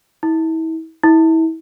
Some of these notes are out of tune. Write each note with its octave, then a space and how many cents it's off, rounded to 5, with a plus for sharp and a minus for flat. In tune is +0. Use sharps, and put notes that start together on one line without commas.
E4 -35
E4 -30